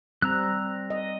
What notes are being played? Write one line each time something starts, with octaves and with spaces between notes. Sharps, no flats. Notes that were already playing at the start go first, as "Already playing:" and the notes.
G3 C4 A#5 E6 F#6
D#5